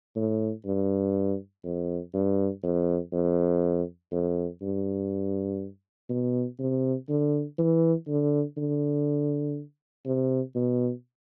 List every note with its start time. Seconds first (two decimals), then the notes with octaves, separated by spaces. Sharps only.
0.16 A2
0.65 G2
1.64 F2
2.14 G2
2.63 F2
3.13 F2
4.12 F2
4.62 G2
6.09 B2
6.59 C3
7.09 D3
7.58 E3
8.08 D3
8.57 D3
10.06 C3
10.55 B2